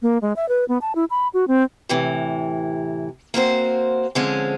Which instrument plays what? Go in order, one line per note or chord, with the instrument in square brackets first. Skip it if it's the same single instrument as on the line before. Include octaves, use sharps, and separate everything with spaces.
[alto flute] A#3
G#3
E5
B4
B3
A5
E4
B5
F#4
C4
[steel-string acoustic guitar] A2 C3 E3
A#3 C4 F#4 C5
D3 F3 G#3 C4 C#4